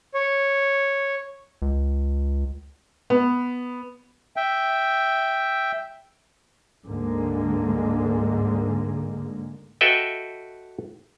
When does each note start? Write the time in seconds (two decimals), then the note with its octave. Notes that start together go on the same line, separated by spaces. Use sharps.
0.14 C#5
1.62 C#2
3.10 B3
4.36 E5 G5
6.87 D2 G#2 D3 G#3 A#3
9.81 F#4 A4 B4 D#5 E5 G5